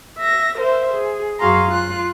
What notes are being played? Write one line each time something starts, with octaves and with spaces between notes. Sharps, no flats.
E5 A#6
A#4 C5 E5
G#4
F#2 F#4 G#4 F5 A#5 C6
F4 F#6